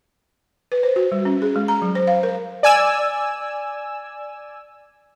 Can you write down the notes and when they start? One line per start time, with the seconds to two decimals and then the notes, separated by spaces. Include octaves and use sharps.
0.72 B4
0.83 C5
0.96 F#4
1.12 G3
1.25 C#4
1.42 G#4
1.56 G#3
1.68 A#5
1.82 F#3
1.95 C5
2.07 F5
2.23 A#4
2.63 D5 G#5 E6